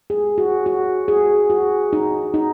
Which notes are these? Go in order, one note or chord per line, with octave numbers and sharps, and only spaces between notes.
G#4
F#4
F#4
G#4
F#4
D#4
D#4